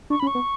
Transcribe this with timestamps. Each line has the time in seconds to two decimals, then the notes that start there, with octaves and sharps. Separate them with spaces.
0.10 D4 C#6
0.20 C#4 B5
0.27 C#6
0.35 B3